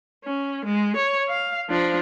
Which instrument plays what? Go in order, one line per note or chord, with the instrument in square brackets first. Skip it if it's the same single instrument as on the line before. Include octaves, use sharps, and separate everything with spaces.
[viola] C#4
G#3
C#5
F5
F3 D4